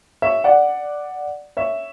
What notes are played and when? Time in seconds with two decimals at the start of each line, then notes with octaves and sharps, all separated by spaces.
0.22 C#5 E5
0.44 D5 F#5
1.57 C#5 E5